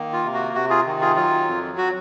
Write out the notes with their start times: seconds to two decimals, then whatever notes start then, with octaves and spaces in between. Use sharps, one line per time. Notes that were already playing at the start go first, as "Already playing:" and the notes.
Already playing: D#3 A#3
0.13 F4
0.24 C3
0.34 F#4
0.55 C3 F#4
0.70 F4 G#4
0.86 D#3
1.01 F4 G#4
1.16 F#3 F4
1.48 F2
1.78 F#4